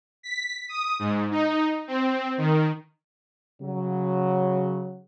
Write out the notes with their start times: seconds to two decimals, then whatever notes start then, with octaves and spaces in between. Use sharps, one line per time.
0.23 B6
0.69 D#6
0.99 G#2
1.31 D#4
1.88 C4
2.38 D#3
3.61 C#3 F#3